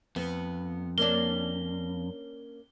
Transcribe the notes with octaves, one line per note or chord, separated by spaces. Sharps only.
F2 B3
A#3 C#4 D4 G7